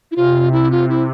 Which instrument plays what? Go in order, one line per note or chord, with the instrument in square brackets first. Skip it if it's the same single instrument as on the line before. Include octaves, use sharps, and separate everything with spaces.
[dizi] E4
[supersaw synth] C3 [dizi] F4
[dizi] E4
F4
E4